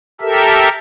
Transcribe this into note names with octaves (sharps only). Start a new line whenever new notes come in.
G4 A4 A#4 E5